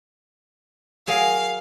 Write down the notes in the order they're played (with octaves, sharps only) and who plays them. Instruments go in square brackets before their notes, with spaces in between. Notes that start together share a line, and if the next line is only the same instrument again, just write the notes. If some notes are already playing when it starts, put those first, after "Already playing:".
[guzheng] F#3 G#4 A#4 [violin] F5